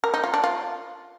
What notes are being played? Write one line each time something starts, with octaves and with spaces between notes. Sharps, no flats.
A#4
D#4
F4
D4
F4